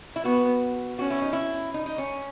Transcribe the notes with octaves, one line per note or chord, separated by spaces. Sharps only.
E4
B3 F#4
C#4 F#4
E4
D#4
E4
D#4
D#4
C#4